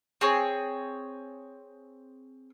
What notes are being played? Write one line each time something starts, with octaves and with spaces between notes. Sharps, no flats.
C4 G#4 C#5